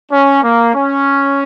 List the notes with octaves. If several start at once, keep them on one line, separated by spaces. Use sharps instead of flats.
C#4
A#3
C#4